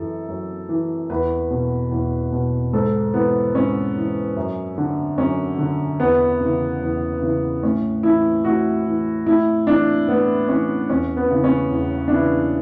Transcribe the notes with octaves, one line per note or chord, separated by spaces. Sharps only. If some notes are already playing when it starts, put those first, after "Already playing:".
Already playing: F#2 E3 A4
F#2
E3
E2 B4
B2
E2
B2
G#2 A4
E3 B3
G#2 C#4
E3
F#2
D3
F#2 C#4
D3
E2 B3
C#3 E3
E2
C#3 E3
A2 C#4
E3 E4
A2 F#4
E3
A2 E4
E3 D4
A2 B3
E3 C#4
E2 C#4
B3
C#3 E3
C#4
E2
D4
C#3 E3 E4